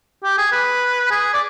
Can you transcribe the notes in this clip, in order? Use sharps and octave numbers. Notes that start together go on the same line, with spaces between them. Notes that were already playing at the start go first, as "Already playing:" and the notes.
G4
G#4
B4
G#4
D5